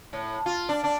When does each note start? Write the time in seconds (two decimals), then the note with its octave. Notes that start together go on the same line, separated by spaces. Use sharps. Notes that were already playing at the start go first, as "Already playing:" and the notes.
0.13 A2
0.46 F4
0.69 D4
0.84 D4